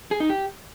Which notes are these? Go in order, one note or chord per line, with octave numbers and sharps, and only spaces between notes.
G#4
D#4
G4